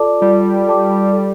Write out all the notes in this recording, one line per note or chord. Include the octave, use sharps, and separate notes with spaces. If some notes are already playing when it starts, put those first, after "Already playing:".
Already playing: F4 A4 D5 A5 D6
G3 F4
A4 D5 A5 D6
A4